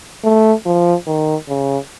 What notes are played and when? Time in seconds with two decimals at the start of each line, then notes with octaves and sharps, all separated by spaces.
0.24 A3
0.66 F3
1.07 D#3
1.49 C#3